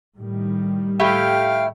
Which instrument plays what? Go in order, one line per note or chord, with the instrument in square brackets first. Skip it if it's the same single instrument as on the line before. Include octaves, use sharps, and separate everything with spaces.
[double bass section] A2 D#3 G3
[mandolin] A3 E4 G4 [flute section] F5 G5 F6